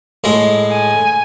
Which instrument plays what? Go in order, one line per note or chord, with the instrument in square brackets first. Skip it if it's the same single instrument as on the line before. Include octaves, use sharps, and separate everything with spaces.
[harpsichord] A2 G#3
[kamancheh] G#5